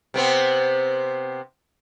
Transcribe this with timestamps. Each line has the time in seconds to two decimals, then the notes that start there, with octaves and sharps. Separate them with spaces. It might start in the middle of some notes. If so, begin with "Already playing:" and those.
0.14 C3 B3 C4